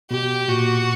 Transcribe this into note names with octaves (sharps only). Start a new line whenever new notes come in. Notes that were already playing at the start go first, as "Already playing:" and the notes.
B2 G4
A#2 F#4